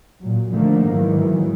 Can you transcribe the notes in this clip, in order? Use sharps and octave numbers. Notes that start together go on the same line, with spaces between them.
A#2 F#3
D3 D#3 F3 A3 A#3
G#2 D#3 E3 F#3